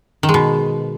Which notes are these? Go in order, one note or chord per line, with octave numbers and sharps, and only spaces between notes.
D#3
G#3
B2